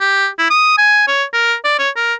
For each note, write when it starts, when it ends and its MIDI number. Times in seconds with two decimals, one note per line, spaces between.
0.01 0.28 67
0.38 0.50 64
0.50 0.74 87
0.78 1.05 80
1.08 1.24 73
1.33 1.55 70
1.65 1.74 74
1.79 1.90 73
1.96 2.14 70